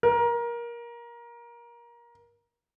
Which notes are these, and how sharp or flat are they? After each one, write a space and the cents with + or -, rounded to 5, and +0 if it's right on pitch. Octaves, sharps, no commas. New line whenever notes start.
A#4 +20